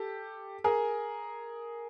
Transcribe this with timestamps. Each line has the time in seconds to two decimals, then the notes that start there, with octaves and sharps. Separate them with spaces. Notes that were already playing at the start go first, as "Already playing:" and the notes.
Already playing: G4 A4
0.64 G#4 A#4